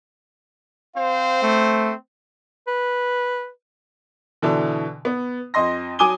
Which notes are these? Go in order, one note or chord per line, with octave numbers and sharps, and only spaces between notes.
C4 C5 F5
A3
B4
B2 D3 E3
B3
F2 D#5 C6 A#6
F#3 G#5 D6 D#6 D#7 G7